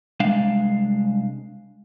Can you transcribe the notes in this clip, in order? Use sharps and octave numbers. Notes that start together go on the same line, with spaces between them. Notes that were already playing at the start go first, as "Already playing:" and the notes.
C2 G#3 D4 F5